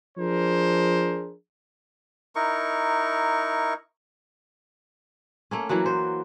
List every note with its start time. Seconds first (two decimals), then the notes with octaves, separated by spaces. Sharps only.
0.18 F3 D4 G#4 A#4 C5
2.35 D#4 E4 A#4 C#6
5.51 A3 A#3 C#4
5.69 E3 F#3 A#3 F#4
5.86 C5